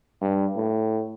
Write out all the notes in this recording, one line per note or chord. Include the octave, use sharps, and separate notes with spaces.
G2
A2